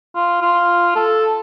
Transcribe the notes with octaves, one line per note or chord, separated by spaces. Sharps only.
F4
F4
A4